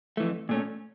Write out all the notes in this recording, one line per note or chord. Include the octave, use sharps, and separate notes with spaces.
F2 E3 A3
A#2 A3 C#4